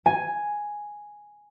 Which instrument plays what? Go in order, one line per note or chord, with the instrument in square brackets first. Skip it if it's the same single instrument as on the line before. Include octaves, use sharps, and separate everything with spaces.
[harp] G#5